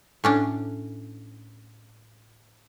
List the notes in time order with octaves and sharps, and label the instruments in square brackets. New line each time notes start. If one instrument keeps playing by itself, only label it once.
[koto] A2 C#4 D4